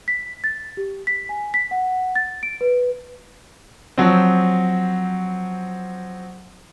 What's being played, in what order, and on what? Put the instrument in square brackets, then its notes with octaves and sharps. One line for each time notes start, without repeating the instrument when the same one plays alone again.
[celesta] B6
A6
G4
B6
G#5
B6
F#5
A6
D7
B4
[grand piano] F3 F#3 C4